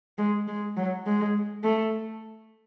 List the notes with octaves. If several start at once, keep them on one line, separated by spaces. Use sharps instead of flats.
G#3
G#3
F#3
G#3
A3